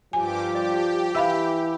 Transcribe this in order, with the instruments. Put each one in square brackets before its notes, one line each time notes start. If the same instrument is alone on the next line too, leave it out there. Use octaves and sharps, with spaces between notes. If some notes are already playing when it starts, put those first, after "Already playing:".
[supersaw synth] G2 G4 D6 [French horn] F3 [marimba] G#5
[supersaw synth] G4 [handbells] D5
[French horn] E3 [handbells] E4 E5 B5 [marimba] F5 E6